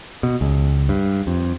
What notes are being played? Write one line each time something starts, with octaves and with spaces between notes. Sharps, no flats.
B2
C#2
G2
F2